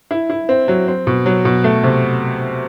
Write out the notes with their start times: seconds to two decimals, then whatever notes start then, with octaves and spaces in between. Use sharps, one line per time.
0.11 E4
0.30 E4
0.49 C4
0.68 F#3
0.88 C4
1.07 B2
1.26 F#3
1.45 B2
1.64 A3
1.83 C3